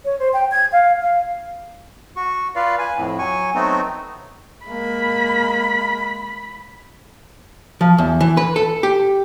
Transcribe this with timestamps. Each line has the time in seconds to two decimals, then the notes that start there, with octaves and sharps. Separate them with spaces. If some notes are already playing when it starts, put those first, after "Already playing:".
0.05 C#5
0.19 C5
0.33 G5
0.51 G#6
0.72 F5
1.01 F5
2.16 F#4 C#6
2.55 F4 B4 D5 F5
2.79 B4 G#5
2.97 F2 A2
3.19 F#3 G#5 C#6
3.54 F#3 A3 B3 C4 D#4 F#4
4.67 G#3 A#3 B5
7.81 F3
7.98 E2
8.20 E3
8.37 B4
8.56 A4
8.83 G4